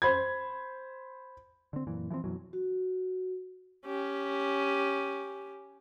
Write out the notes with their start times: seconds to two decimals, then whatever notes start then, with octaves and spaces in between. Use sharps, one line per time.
0.02 C5 B5 G#6
1.73 D3 C4
1.87 F#2 A#2 E3
2.10 E3 F3 G#3 C4
2.24 F#2 B2 E3 F#3
2.53 F#4
3.86 C#4 G4